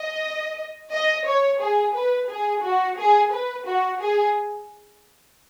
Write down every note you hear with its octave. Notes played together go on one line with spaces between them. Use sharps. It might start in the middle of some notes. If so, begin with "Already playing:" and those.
Already playing: D#5
D#5
C#5
G#4
B4
G#4
F#4
G#4
B4
F#4
G#4